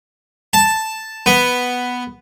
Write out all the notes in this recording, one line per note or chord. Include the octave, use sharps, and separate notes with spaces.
A5
B3